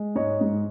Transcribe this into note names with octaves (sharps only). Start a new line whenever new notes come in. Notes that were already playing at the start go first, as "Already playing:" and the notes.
Already playing: G#3
G#2 C#5 D#5
G#2